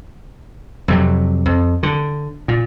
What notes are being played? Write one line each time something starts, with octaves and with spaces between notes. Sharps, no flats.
F2 C3 F#3
F2
D3
A#2